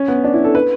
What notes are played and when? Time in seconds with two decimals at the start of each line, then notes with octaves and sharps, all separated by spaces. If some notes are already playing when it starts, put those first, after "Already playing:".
Already playing: C#4
0.08 B3
0.24 D4
0.34 E4
0.44 A4
0.55 B4